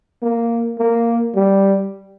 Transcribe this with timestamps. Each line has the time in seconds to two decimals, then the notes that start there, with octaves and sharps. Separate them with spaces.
0.23 A#3
0.79 A#3
1.35 G3